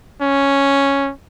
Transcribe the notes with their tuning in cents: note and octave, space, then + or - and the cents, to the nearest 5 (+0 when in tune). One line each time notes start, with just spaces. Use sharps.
C#4 +0